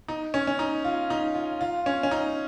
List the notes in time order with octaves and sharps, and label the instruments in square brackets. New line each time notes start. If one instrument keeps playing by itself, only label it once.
[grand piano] D#4
C#4
C#4
D#4
F4
D#4
F4
F4
C#4
C#4
D#4